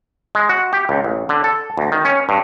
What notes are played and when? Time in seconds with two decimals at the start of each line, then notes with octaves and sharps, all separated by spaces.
0.35 G#3
0.49 F#4
0.73 G4
0.89 C#2
1.04 A1
1.29 D3
1.44 A4
1.77 D2
1.92 D#3
2.05 C#4
2.29 G2